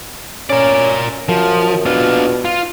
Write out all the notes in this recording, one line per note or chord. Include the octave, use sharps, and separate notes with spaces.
C#4 A#4 D5
F#2 F3
B2 D4 F4
F4